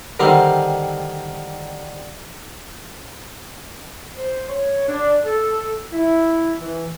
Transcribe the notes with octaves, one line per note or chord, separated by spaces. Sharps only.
D3 D#3 G3 C4 C6
C5
C#5
D4
A4
E4
E3